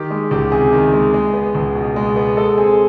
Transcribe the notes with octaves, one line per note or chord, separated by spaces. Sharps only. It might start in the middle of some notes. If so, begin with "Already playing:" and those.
Already playing: D#3 G4
G#3
C#2 G4
C3 G#4
D#3
G#3
G#3
B3
C#2
B2
G#3
B3
G#3 A4
C4 G#4